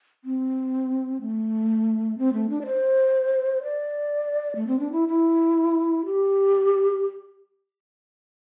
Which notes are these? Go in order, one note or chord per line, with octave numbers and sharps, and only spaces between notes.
C4
A3
C4
A3
D4
D5
C5
D5
A3
C4
D4
E4
E4
G4